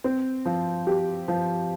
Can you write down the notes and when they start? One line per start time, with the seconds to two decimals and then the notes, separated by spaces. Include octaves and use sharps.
0.04 C4
0.45 F3
0.87 G4
1.28 F3